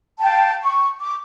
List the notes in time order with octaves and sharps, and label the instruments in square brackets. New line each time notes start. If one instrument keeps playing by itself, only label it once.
[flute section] F5 G5 A5
C#6
D6